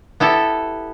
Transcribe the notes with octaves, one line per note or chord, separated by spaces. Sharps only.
B3 E4 G4 A4